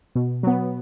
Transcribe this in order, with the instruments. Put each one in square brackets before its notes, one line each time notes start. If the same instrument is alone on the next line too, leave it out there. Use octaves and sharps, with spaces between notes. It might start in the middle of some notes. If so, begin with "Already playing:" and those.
[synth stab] B2
F#3 B3